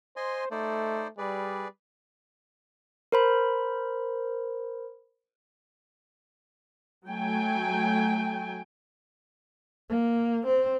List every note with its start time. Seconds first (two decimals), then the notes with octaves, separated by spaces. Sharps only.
0.16 C5 D#5 G#5 C6
0.51 A3 D#4 C5 D5
1.18 G3 G#4 B4 D5
3.12 A#4 C5 B5
7.09 F#3 A3 G5 G#5
9.89 A#3
10.46 C4